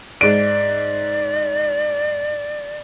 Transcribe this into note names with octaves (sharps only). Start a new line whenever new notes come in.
G#2 D5 D7